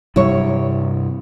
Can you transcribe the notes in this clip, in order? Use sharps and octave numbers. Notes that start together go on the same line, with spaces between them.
G2 C3 G3 E4 C#5